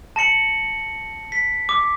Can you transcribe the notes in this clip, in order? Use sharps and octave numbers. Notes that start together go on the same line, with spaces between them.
A5 A#6 C#7 F#7
B6
D6